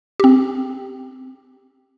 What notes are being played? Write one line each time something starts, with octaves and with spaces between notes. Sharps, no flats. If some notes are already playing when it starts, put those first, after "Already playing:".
C4 G4